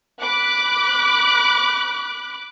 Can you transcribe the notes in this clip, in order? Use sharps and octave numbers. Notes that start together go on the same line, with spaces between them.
B5 D6 F#6